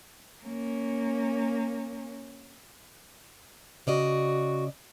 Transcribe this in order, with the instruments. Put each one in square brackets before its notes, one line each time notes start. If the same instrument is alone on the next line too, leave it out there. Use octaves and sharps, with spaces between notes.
[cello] A#3 C#4
[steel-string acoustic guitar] C#3 D5 D#5 [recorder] F#4